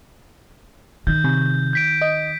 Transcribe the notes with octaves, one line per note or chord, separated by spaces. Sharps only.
D#3 G6
C3
G6 B6 D7
D#5